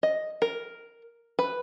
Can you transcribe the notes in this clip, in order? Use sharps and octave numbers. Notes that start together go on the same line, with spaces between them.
D#5
A#4
B4